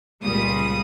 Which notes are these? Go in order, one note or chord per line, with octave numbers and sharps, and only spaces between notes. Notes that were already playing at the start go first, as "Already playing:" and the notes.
C#2 A#2 G3 D#6